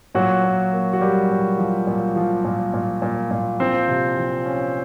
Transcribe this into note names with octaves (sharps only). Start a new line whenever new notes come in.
A#2 F#3 F#4
A#2
A#3
F#4
G3 A#3 G4
A#2
F3
A#2
F3
A#2
A#2
A#2
A#2
F3 C4 C5
C3
F3
C#4